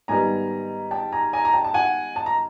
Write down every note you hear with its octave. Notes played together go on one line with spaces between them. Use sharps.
G#2 D#3 G3 B3 G#5 A#5
G5 A5
G#5 A#5
G#5 A#5
A#5
G5 A5
A5
F#5 G#5
A5
A#5